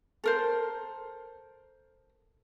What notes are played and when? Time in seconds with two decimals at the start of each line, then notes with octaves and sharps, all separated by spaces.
0.24 A4 A#4 C5